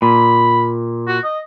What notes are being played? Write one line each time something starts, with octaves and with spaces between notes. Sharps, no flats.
A#2 B5
F#4
D#5